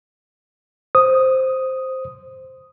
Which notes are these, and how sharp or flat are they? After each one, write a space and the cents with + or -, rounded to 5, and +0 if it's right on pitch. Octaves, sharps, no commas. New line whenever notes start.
C5 +0 D#6 +0